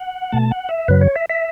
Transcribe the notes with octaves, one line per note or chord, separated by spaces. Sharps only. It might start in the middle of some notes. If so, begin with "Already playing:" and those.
Already playing: F#5
B2 A3 A5
F#5
E5
F#2 C#3 F#3 B4
C#5
E5
E5